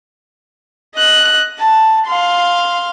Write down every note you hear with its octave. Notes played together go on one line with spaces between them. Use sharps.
D#5 F#6
A5
F5 C6